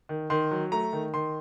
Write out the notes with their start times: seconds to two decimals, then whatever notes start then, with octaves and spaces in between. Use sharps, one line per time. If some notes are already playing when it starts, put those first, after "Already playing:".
0.09 D#3
0.30 D#3 C6
0.51 F#3
0.72 A3 A#5
0.93 D#3
1.14 D#3 C6